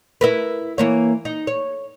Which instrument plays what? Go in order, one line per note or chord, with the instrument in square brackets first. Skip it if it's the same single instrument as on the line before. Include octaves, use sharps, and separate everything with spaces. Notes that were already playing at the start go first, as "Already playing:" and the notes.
[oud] E4 A#4 B4
E3 A#3 C#5
D#4
C#5